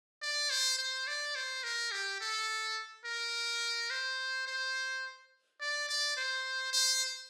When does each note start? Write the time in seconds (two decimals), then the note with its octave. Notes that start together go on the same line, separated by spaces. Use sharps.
0.22 D5
0.50 C5
0.78 C5
1.07 D5
1.36 C5
1.64 A#4
1.92 G4
2.20 A4
3.05 A#4
3.90 C5
4.47 C5
5.61 D5
5.89 D5
6.17 C5
6.73 C5